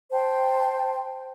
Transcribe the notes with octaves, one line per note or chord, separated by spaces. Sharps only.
C5 G5 A5